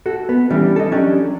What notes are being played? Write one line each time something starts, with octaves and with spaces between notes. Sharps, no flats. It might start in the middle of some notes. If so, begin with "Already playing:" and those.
F#4 A4
B3
E3 G3 C#4 D4
A4 D#5
F#3 C#4 D4 G4